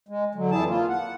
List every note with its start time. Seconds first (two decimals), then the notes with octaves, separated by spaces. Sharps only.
0.09 G#3
0.35 D3 F#3
0.51 F2 E3 E4 G#4 A5
0.67 A#3 F4
0.89 F#5